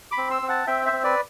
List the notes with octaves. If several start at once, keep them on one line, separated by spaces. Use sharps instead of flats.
B5 D6
C4
C6 E6
C4
F#5 A5
C4 E5 G5
C5 E5
C4
B4 D5